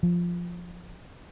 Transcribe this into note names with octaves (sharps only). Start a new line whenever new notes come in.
F3